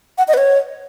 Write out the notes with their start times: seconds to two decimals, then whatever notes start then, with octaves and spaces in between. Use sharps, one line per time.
0.18 F#5
0.28 D#5
0.34 B4
0.37 C#5